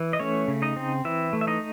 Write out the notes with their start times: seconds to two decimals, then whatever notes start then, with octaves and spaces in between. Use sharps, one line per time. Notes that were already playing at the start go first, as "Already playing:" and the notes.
Already playing: E3
0.13 D#5
0.19 A3 C#4 C#5
0.48 C#3
0.62 D#4 D#5
0.76 C4
1.05 E3 E4 E5
1.33 A3
1.41 E5
1.47 D#4 D#5